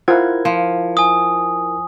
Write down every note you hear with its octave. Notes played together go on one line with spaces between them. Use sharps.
E4 F4 A#4 C5 F#5 G#6
F3
G#5 D#6